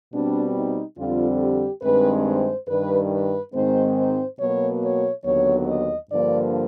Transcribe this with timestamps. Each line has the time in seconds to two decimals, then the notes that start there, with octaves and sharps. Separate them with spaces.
0.12 B2 G3 C4 D4
0.54 D#4
0.97 F2 D3 G3 C4 F4
1.41 G4
1.82 G2 D#3 G#3 C4 B4
2.25 C5
2.68 G2 D#3 G3 B4
3.11 B4
3.53 G#2 D#3 G#3 C4 C5
3.96 C5
4.38 B2 F#3 A#3 C#5
4.82 C#5
5.24 D#2 D3 F#3 B3 C#5
5.67 D#5
6.09 G2 D3 F3 A#3 D5